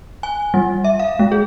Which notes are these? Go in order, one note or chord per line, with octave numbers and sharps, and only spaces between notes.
G#5
G3
E5
F5
G#3
G#4